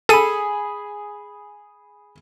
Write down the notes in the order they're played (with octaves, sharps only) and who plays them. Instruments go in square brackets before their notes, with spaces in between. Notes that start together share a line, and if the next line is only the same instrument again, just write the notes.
[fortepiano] G#4 B5 [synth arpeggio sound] A4 D#7